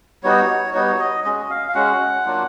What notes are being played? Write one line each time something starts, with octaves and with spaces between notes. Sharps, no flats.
G3 B3 D#4 F#4 C#5
G3 B3 D#4 F#4 C#5
D#5
G#3 C#4 F#4 D#5
F5
F5
G#3 C#4 F#4 F#5
F#3 A#3 D4 F4